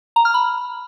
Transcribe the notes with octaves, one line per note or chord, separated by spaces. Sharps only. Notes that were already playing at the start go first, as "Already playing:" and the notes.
A#5
F6
B5